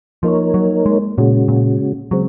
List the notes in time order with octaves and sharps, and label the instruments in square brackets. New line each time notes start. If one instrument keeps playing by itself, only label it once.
[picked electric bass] F3 [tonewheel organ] A#3 D#4 A#4 C#5
[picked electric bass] F#3
G#3
[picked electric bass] A#2 [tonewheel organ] C#3 G#3 C#4 F#4
[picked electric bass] A#2
[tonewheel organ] C#3 G#3 C4 [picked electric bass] F#3